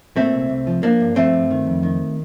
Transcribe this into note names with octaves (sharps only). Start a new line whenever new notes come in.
A#2 A3 C4
C2
C2
F3
F3 A#3 D4
G2
F3 A3 C4
G2
D#3
F2
D#3